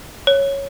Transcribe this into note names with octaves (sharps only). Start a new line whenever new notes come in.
C#5